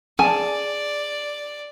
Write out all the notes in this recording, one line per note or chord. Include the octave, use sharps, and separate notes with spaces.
G#4 D5 G#5 A5